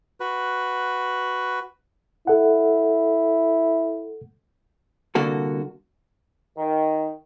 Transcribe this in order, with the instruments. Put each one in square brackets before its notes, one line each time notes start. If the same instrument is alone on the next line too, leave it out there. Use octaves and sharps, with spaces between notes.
[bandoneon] F#4 B4
[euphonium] E4 [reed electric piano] A4 F#5
[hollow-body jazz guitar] C2 D3 A#3 F#4 A4
[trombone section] D#3